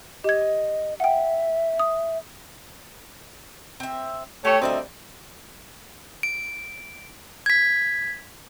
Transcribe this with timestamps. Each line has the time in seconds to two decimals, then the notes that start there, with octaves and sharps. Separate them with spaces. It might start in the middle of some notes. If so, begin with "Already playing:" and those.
0.24 G4 D#5 G#6
1.00 E5 F#5 G5
1.79 D#6
3.80 C4 E5
4.45 A3 G4 C#5
4.62 D2 G3 C4 D#4 D5 E5
6.23 D7
7.46 G#6 B6